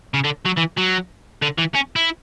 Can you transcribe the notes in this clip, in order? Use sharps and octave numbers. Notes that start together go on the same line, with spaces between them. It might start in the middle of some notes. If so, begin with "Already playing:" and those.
C#3
D3
F#3
E3
F#3
D3
E3
C#4
E4